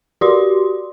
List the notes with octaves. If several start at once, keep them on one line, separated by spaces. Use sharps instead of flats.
F#4 G4 D5 C6